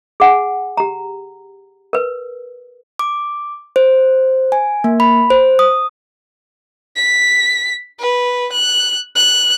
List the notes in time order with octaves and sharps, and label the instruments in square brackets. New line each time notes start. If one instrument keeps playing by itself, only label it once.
[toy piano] G#4 F#5 G#5
G4 A#5
A#4 B4
[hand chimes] D6
C5
G#5
A#3
B5
C5
D#6
[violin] B6
B4
F#6
F#6